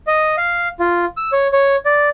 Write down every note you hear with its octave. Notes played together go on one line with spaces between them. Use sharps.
D#5
F5
F4
E6
C#5
C#5
D5